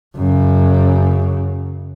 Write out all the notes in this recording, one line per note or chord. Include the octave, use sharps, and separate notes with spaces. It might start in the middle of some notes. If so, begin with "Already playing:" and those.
F#2 C#3